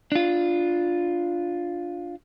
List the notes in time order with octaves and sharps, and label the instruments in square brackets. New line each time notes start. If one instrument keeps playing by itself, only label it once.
[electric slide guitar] D4 F4